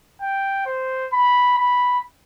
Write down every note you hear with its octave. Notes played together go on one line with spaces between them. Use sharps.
G5
C5
B5
B5